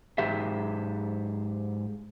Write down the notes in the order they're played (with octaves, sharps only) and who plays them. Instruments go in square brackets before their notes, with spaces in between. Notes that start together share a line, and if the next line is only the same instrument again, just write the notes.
[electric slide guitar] G#2 G4 G#4 E5